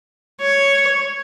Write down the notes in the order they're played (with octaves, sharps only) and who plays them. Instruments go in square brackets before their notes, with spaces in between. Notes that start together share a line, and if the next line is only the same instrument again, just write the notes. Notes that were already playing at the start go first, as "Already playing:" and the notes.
[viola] C#5